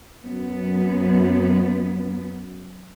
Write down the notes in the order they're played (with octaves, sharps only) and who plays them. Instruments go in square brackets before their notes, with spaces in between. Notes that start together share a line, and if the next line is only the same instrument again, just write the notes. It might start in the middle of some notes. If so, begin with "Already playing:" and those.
[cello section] F#2 B3